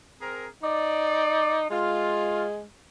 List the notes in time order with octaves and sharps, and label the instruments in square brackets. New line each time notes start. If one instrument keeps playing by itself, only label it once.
[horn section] C4 G#4 A#4
[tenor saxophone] D#4 [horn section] D5
[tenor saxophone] G#3 [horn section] F4